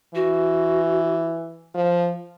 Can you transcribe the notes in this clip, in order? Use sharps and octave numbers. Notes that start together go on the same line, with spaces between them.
E3 F#4
F3